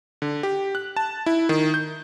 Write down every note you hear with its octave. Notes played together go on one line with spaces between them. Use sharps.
D3
G4
F#6
A5
E4
D#3
G6